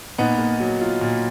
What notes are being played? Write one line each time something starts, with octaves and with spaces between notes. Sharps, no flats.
A#2 B3 D#4
A#3
F#3
F4
A#2